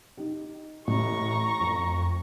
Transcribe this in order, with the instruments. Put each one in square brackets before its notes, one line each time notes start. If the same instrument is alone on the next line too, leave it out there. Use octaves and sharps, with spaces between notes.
[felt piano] D#4 G4
[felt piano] A1 [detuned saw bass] A2 [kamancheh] A#5 C#6
[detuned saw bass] F2